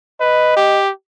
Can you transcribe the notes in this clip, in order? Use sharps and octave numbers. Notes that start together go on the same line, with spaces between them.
B4 D#5
G4